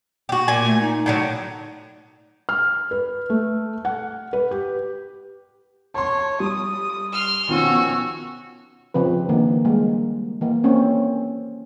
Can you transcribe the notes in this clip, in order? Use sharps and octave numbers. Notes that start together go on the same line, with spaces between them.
F#4 G4
A#2 G#5
A3
D#4
A2 D3 F#3
F6
B4
A3
F#5
B4
G4
C#5 A5 C6
G3 D#6
C6 F6
B2 D#3 F3 C#4 F#4 E6
C#3 F3 C4 B4
D#3 A#3 D4
G3 G#3 A#3
E3 A#3
A#3 C4 C#4